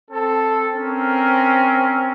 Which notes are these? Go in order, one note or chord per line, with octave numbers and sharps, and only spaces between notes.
C4 A4
C4 C#4 A#4